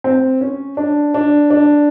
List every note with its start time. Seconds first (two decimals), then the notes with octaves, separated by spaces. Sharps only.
0.04 C4
0.41 C#4
0.77 D4
1.14 D4
1.50 D4